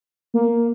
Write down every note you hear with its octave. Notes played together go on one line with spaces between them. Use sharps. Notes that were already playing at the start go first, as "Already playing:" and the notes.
A#3